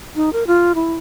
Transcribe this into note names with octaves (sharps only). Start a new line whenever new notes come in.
D#4
A#4
F4
E4